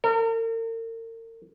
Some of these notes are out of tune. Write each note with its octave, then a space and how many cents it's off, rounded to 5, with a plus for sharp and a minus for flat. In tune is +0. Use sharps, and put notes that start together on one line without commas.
A#4 -40